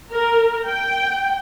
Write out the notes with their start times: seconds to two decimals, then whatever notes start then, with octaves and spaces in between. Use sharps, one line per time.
0.13 A#4
0.68 G5